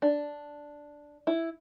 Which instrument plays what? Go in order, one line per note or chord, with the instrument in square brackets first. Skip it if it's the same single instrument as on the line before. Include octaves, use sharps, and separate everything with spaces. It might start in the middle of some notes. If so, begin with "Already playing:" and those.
[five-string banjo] D4
E4